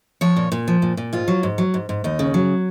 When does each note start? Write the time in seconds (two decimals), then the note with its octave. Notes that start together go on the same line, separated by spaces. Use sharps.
0.21 F3 C#5
0.36 A#2
0.52 A#2
0.68 F3
0.82 A#2
0.97 A#2
1.13 G#2 F4
1.28 F#3
1.43 G#2
1.58 F#3
1.74 G#2
1.89 G#2
2.04 D#2 D#4
2.19 C#3
2.34 F#3